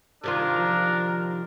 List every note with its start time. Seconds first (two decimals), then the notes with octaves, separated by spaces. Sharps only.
0.24 C3 D#3 D4 F4 A#4
0.56 F3 A#5